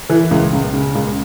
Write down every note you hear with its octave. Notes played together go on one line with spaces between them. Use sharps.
E3
C#2
C#2
C#3
C#2